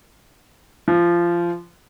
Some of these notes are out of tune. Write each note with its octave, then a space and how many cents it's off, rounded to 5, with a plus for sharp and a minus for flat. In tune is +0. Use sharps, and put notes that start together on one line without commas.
F3 -20